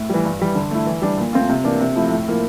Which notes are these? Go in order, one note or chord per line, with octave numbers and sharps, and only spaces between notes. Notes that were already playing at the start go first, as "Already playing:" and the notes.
Already playing: A2
E3 G3
G2
E3 G3
D3
A3 E4
E3
G3 D4
A#2
A3 C4 F4
C3
E3 A#3 D4
C3
F3 A3 E4
A2
F3 A#3 E4